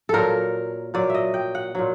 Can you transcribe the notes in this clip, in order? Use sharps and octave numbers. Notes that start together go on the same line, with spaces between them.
A#2 F#3 A4 A#4
A#2 F#3 D5
D#5 E5
G5
F#5
A#2 F#3